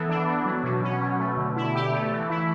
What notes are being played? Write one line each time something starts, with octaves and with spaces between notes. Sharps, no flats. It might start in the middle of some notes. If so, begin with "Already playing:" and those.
Already playing: E3 B3 A4
D4
E3
F#3
B2
C#4
B2
A3
D3
E4
G4
A3
E3
E4